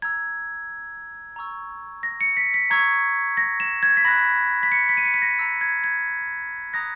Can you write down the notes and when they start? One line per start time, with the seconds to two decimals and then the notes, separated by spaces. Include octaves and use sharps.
0.02 A#5 E6 G#6
1.36 A#5 C#6 E6
2.03 A#6
2.21 C#7
2.37 B6
2.54 B6
2.70 A#5 C#6 E6 G#6
3.37 A#6
3.60 E7
3.83 G#6
3.97 B6
4.05 B5 F#6 A#6
4.63 B6
4.72 C#7
4.89 B6
4.97 D#7
5.05 C#7
5.14 B6
5.22 A#6
5.39 A#5 E6
5.61 G#6
5.84 G#6
6.73 A#5 D#6 F#6 A#6